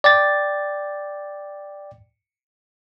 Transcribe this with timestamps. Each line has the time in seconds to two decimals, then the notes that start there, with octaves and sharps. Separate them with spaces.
0.04 D5 G5 A6